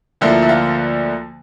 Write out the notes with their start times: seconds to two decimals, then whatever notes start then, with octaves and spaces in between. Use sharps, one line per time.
0.21 D2 D3 F3 A#3 E4
0.42 E4
0.49 F4